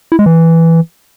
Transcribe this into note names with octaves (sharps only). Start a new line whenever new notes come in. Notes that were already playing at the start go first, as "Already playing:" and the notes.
E4
G#3
E3